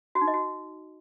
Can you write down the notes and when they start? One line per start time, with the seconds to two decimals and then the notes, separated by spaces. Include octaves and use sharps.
0.15 F#4
0.21 D#4
0.28 D#5
0.34 F#4